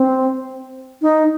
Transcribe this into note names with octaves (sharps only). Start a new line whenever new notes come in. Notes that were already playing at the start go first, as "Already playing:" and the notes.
Already playing: C4
D#4